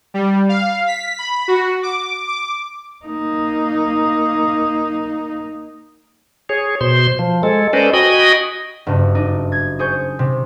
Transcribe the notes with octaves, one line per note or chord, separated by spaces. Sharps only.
G3
F5
B6
B5
F#4
D6
D6
A#3 D#4
G#4 C#5
B2 C5 C6
F3
G#3 A4
C#4 A4 B4 C5 D5 D#5
F#4 D#5 G5 G#5 B5 D#6
F#1 G2
D4 D#4
G#6
G#4 C5 C#6 G6
C3